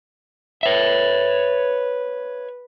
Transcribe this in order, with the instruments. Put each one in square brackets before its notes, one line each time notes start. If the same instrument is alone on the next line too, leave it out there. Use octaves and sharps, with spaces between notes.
[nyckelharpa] B4 [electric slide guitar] C#5 E5